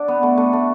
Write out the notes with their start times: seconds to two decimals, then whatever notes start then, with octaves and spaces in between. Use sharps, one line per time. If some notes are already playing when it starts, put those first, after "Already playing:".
Already playing: D4 F#4 D5
0.08 B3
0.23 A3
0.37 A3
0.53 A3